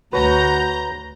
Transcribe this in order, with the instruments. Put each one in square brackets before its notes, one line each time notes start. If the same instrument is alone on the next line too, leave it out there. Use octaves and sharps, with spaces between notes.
[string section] D2 A#5 G6 [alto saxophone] F#4 [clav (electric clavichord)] B4 C#5